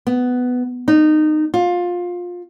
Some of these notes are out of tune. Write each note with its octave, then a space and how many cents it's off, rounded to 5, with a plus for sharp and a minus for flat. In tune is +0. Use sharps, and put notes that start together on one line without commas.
B3 +10
D#4 -20
F4 +20